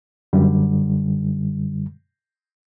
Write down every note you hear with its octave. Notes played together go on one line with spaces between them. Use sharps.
F#2 D3 G3